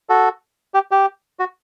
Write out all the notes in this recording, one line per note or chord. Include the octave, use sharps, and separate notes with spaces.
F#4 A4
G4
G4
F#4